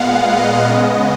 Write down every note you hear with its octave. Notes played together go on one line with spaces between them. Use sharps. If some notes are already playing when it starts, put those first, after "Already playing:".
Already playing: A#2 G#3 B3 F5 F#5
D#5
C#3 G#3 B3